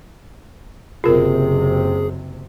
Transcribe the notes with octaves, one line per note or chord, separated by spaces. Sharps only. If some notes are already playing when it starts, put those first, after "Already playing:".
F#1 C3 F4 G#4 A#4